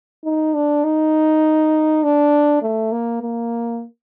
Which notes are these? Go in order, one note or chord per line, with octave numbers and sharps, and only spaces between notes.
D#4
D4
D#4
D4
A3
A#3
A#3